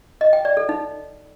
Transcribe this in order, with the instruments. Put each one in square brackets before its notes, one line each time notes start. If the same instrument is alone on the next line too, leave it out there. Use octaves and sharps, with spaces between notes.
[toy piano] D#5
G5
D5
A4
D#4